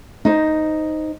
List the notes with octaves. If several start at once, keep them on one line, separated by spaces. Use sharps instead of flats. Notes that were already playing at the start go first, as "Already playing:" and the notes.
D#4 C5